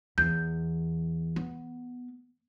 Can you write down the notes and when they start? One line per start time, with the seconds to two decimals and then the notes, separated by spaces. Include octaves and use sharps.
0.18 E2 G6
1.36 B3